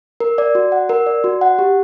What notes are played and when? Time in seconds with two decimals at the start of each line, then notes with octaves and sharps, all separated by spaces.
0.20 A#4
0.38 D5
0.55 F#4
0.72 F#5
0.89 A#4
1.06 D5
1.24 F#4
1.41 F#5
1.59 G4